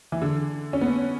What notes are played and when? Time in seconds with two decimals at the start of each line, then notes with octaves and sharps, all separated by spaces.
0.12 E3
0.22 D3
0.73 C#4
0.81 B3